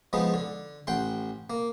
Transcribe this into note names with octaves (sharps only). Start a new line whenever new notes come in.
F3 G#3 B3 D#4
D3
A1 F#5 G5 C6
A#3